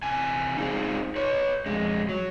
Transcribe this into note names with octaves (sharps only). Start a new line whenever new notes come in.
C3 E3 G#5
C4 D#4 F4 G4 G#4 C5
B4 C#5
F2 G#3
F#3